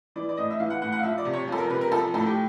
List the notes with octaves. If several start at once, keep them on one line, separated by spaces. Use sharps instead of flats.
E3 D5
D5
A2 D#5
E5
E3 F5
F#5
A2 F#5
F#5
F5
F3 E5
D5
C3
C#5
F3 A4
A#4
C3 B4
A#4
F3 A4
A2 A4
G4